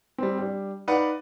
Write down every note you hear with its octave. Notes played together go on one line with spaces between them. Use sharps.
G3 C4
G3 D4
D#4 B4 D5 F5 F#5